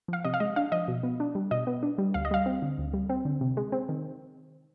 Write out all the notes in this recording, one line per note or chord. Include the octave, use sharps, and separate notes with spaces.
F3 F5
C3 D#5
F5
G#3 D#5
D4 F5
F3 D#5
B2
B3
D4
G3
B2 D#5
B3
D4
G3
D2 F5
D#5
G3 F5
C4
D3
D2
G3
C4
D3
C3
G#3
C4
D#3